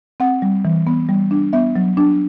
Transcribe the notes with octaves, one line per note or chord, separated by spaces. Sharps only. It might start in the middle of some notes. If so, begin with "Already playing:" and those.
C4 F#5
G3
E3
B3
G3
D4
B3 E5
F#3
D4